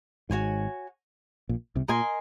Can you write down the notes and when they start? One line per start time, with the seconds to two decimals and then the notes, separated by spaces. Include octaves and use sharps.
0.30 G#1 G#2 F#4 C#5 G#5
1.49 A#1 A#2
1.76 C2 C3
1.88 A#2 A#4 D#5 G#5 C6